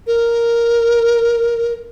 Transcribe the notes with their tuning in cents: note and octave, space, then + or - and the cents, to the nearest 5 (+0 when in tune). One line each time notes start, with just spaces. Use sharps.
A#4 +5